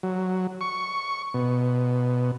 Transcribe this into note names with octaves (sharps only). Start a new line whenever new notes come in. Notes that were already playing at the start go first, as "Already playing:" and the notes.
F#3
C#6
B2